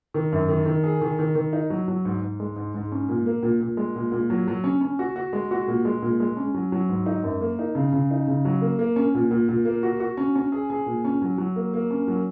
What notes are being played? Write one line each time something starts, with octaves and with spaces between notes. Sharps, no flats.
D#3
F#2
D#3
D#3
G#4
D#3
D#3
D#3
D#4
F#3
F#3
G#2
G#2
G#3
G#2
G#2
C#4
A#2
A#3
A#2
A#2
G#3
A#2
A#2
F#3
F#3
C#4
C#4
F#4
F#4
G#3
F#4
A#2
G#3
A#2
G#3
C#4
F#3
F#3
G#2
D#4
F#2
A#3
D#4
C#3
C#3
D#4
C#3
F#3
A#3
A#3
C#4
A#2
A#2
A#2
A#3
F#4
F#4
C#4
C#4
G#4
G#4
A#2
C#4
F#3
F#3
A#3
A#3
C#4
F#3